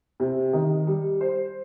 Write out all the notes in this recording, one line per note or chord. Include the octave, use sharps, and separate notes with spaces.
C3
D#3
G3
C5